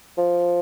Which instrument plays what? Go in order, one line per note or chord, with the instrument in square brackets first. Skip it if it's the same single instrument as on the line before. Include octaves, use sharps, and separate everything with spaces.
[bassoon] F3